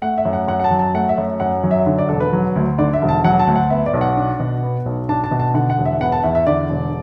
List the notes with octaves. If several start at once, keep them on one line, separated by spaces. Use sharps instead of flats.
A3 F#5
E5
F#2
F#5
F#2 F#5
F#5
A5
F#3
A5
A3 F#5
E5
F#2
F#2 F#5
F#3
E5
D3
D5
E1 A4
B4
F#3
D2
D3 D5
E5
E1
A5
F#3 F#5
A5
D2
F#5
B3 E5
D5
B1
F#5
D4
B2
B3
B1
D4 A5
A5
B2
A5
D3 F#5
F#5
E1
E5
B3 F#5
A5
E2 E5
E5
D3 D5
E1